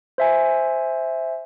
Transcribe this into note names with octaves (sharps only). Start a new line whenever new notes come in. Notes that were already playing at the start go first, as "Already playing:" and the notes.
C5 E5 G#5